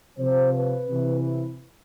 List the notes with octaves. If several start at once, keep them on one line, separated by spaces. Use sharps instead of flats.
C3 F3 C5
B4
C3 E3